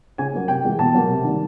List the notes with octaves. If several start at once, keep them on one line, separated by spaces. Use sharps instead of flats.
C#3 G#5
F#3 A#3
C3 G5
E3 G#3
B2 A5
F#3 A#3
C3
D#3 G3